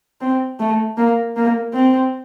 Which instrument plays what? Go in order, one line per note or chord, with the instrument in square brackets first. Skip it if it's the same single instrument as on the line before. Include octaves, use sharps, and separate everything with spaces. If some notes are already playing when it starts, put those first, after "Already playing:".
[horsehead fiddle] C4
A3
A#3
A#3
C4